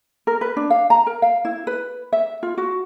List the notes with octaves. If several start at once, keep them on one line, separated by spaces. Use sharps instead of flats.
A#4
B4
D4
F5
A#5
A#4
F5
E4
B4
E5
F4
F#4